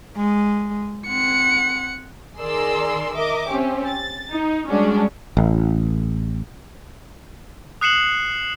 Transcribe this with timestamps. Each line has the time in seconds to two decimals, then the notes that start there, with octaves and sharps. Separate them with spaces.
0.16 G#3
1.08 C4 F#5 C#7
2.40 D#3 G#4 A#4 D5 C6 E6
3.16 A#4 D#5 E5 D6
3.50 C4 C#4 G4
3.87 A6
4.32 D#4
4.69 G3 G#3 C#4 D4 F#4
5.37 A1
7.81 D#6 F#6 C7 C#7 E7 F#7